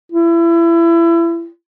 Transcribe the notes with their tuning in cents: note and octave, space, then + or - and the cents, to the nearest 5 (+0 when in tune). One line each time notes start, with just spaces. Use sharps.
E4 +30